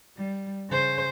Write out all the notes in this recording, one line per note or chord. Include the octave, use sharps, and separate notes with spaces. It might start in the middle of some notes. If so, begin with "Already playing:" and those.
G3
C#3 C5